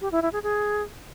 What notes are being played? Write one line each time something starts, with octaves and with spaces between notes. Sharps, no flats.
G4
E4
E4
G#4
G#4